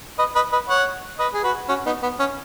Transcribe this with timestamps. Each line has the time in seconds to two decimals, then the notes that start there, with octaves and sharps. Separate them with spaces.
0.19 B4 D#5
0.35 B4 D#5
0.53 B4 D#5
0.68 C#5 F#5
1.19 B4 D#5
1.34 G#4
1.44 F#4 B4
1.69 C#4 F#4
1.86 B3 D#4
2.02 B3
2.19 C#4